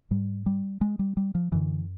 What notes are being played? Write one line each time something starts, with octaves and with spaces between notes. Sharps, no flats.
G#2 G3
G3
G#3
G3
G3
F3
F#2 D3 E3